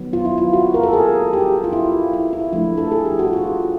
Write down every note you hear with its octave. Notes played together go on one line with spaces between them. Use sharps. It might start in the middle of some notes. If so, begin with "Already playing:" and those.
Already playing: D#3 F#3 B3
F4
E4
F4
F#4
A#4
A4
G#4
G4
F4
E4
E4
E4
F3 A3 D4 E4
A4
G#4
G4
F#4
F4